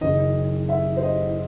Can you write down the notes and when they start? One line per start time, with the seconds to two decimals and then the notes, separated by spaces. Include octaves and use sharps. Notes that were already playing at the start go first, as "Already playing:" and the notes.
0.01 F#1 F#2 D#3 D#5
0.69 E5
0.97 C5
1.03 D#5